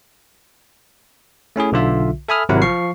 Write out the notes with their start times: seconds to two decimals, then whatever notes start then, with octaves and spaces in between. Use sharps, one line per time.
1.56 A3 C#4 E4 G#4
1.72 B1 D3 F4 E5
2.28 A4 E5 G#5 B5 D#6 F6
2.49 G#1 C3 F#3 E4 A#4 F#5
2.62 F3 F5 C#6 C7